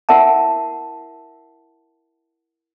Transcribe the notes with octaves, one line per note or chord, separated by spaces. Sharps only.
E4 A#4 E5 F#5 A5